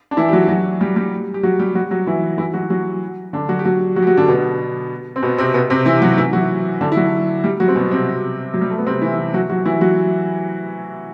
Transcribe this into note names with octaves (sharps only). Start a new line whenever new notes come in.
D4
E3 E4
G4
F#3 F#4
F#3 F#4
G3 G4
G3 G4
G4
F#3 F#4
G3 G4
F#3 F#4
F#3 F#4
E3 E4
E3 E4
F#3 F#4
F#3 F#4
D3 D4
F#3 F#4
G4
F#3 F#4
F#3 F#4
G4
F#3 F#4
D3 D4
B2 B3
C4
B2 B3
C3 C4
B2 B3
C3 C4
E3 E4
F#3 F#4
E3 E4
F#3 F#4
D3 D4
E4
F#3 F#4
G3 G4
F#3 F#4
C4
B2 B3
C3 C4
F#3
G3
A3
B3
C3 C4
E3 E4
F#3 F#4
F#3 F#4
E3 E4
F#3 F#4